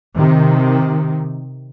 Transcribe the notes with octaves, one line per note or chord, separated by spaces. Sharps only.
C3 D#3